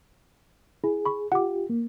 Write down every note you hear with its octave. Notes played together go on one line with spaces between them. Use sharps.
E4 G#4
B5 C#6
F4 G4 F#5 D6
A#3